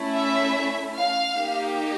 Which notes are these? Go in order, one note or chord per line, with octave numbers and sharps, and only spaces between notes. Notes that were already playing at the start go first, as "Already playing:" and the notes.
Already playing: A3 C#4 E4
E5
F5
A#3 D#4 G4